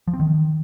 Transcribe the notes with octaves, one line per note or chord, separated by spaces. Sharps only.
F3
C4
D#3